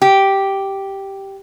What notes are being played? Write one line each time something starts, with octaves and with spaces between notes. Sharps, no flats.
G4